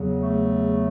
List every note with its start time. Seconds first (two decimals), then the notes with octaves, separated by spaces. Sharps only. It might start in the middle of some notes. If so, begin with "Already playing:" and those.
Already playing: E2 C#3 F#3
0.20 A3